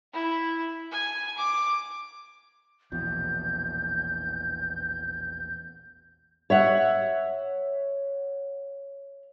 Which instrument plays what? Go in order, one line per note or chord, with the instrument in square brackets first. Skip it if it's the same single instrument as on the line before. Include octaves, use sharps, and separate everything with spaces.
[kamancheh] E4
G#5
D6
[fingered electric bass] A#1 E2 B2 [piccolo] G6
[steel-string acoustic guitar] C#5 E5 F#5